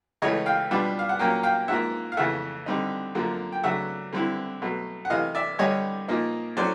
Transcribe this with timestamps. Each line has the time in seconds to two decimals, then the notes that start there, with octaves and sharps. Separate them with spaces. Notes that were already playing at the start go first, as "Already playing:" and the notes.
0.22 C#2 C#3 E3 A3 C#5 D#5
0.46 F5 G5
0.71 B2 G3 B3 D4 F4
0.99 F5
1.09 F#5
1.19 A#2 F#3 A#3 C#4 F5 G5
1.43 F5 G5
1.68 G#2 F3 A#3 E5 F#5
2.12 F5
2.17 F2 C#3 E3 A3 E5 F#5
2.66 D3 G3 C4 D#4
3.15 F#2 D3 F3 A#3
3.52 G5
3.64 C#3 F#3 A3 D4 E5 F#5
4.13 D3 G3 C4 E4
4.62 B2 F#3 A3
5.05 F#5
5.10 C3 E3 A3 D#5 F5
5.35 D5 E5
5.59 G2 D3 G3 C#5 D#5
6.08 A#2 F3 A#3 D#4
6.57 A2 F#3 A3 C#4 C5 D5